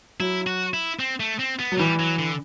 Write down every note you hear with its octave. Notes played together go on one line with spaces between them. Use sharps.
F#3 E4
F#4
E4
C4
A3
C4
B3
F#3
E3 G3
F#3
D3